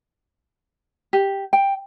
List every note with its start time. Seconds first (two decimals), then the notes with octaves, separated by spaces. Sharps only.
1.13 G4
1.53 G5